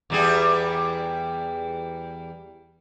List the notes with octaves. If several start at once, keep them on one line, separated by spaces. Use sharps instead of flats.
E2 G3 G#4